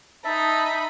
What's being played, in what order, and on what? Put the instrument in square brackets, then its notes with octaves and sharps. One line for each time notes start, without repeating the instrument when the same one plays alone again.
[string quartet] D#4 B5 [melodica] E5 [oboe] A5